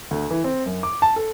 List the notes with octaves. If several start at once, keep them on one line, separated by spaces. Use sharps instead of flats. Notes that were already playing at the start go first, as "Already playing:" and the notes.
D2
E3
C4
F#2
D6
A5
A4